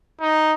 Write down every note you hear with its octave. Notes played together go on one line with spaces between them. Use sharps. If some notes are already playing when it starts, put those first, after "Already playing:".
D#4